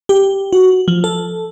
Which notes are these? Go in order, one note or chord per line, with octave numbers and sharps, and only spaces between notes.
G4
F#4
F3
A4